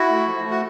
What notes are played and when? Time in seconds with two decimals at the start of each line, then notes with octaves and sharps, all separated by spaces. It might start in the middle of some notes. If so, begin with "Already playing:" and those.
Already playing: E4 F#4
0.09 A3
0.27 F3
0.43 A3
0.51 F#4